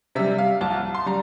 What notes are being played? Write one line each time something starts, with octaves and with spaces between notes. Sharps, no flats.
C3 G3 E5
F5
C2 A5
C6
G3 A#5